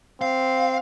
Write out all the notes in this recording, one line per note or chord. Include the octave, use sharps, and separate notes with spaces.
C4 F5